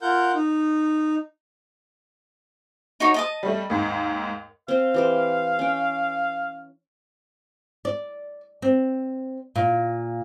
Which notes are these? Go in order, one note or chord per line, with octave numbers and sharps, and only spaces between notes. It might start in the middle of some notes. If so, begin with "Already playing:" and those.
F4 A#4 F#5 G6
D#4
D#4 F#4 C#5
D#5 A5 D#6
G3 A3
D#2 G#2
C4 C5 F5
E3 G4 C5
C#4 G5
D5
C4
A#2